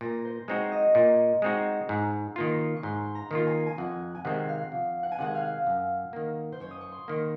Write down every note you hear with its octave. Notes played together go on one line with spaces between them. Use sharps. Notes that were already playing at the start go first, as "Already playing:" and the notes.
A#2 A#5
C5
G#3 C4 D#4 F#4 C#5
D#5
A#2
G#3 C4 D#4 F#4
G#2
D#3 A#3 F4
C#6
G#2 C6
A#5
D#3 A#3 F4
G#5
G#5
F2 F#5
G#5
C3 D#3 G#3 C4 F#5
F5
F2
F#5
G#5
C3 D#3 G#3 C4 F#5
F5
F#2
D#3 A#3
C5
F#2 C#5
D#6
C#6
C6
D#3 A#3